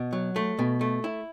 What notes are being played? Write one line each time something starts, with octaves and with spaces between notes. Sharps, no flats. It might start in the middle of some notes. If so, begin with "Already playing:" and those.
Already playing: B2
F#3
A3
B2
A3
E4